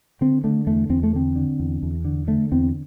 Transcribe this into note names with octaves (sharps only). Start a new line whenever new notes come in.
D3 C4
D3 A3
E2 A3
E2 C4
A3
D3 C4
D3
E2
E2
D3
D3 A3
E2 C4